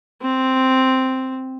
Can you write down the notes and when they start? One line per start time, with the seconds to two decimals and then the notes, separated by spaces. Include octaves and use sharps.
0.22 C4